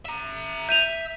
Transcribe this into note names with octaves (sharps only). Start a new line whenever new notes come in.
E5 A#5
E5 G6 D#7 F7